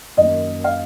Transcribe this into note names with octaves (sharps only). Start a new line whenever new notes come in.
F#2 D#3 A#3 D#5
F5